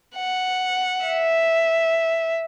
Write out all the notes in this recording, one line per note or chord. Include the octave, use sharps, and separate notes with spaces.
F#5
E5